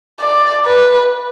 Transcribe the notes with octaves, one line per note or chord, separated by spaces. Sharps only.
D5
B4